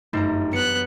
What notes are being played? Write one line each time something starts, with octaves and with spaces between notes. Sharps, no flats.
G1 F#2 A3 D#4 A#5
F#3 B3 F#6 C#7